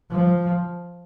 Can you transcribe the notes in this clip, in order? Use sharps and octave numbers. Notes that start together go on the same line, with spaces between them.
F3